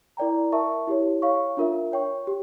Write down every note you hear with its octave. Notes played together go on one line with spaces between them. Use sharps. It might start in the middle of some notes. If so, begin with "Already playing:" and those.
E4 A#4 D5 G5 A#5
A#4 E5 A5 C#6
E4 G4 C#5
C#5 F5 C#6
D4 F4 A#4 E5
C#5 G5 C#6
G4